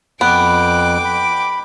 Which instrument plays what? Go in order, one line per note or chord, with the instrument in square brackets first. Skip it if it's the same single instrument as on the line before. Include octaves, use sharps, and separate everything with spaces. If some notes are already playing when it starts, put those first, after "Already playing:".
[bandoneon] F2 F#6 [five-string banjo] B3 [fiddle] G5 D6
[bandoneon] B5